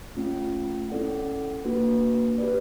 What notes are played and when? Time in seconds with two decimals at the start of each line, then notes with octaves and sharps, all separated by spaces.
0.17 A3 C#4 F4
0.90 C#4 E4 A4 D5 F#5
1.64 A#3 D4 F#4 B4
2.38 G4 B4 D5